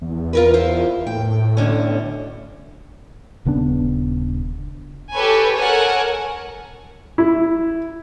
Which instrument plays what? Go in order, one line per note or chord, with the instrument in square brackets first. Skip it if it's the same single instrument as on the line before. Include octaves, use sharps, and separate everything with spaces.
[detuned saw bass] E2
[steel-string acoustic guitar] F4 A#4 B4
E4 F4 C5
[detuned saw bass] A2 [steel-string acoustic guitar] G5
[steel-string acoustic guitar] B2 D3 C#4
[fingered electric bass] D#1 C#3 B3 D4
[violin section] G4 A4 B4 C#5 G#5
A4 A#4 C#5 F#5 G#5
[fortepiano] E4